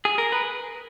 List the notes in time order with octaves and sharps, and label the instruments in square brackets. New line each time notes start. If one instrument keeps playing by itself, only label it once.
[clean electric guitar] G#4
A#4
B4